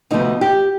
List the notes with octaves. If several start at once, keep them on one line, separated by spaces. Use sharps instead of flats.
D2 C3 F3 B3 D#4
G4